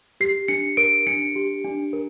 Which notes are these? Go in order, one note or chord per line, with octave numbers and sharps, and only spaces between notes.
G4 C7
D4 C#7
A#4 D7
D4 C#7
G4
D4
A#4